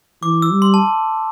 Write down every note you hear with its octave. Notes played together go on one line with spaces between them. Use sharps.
E3 D6
E6
G3
C6
A5